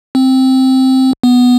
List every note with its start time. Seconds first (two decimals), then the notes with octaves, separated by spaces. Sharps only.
0.15 C4
1.23 B3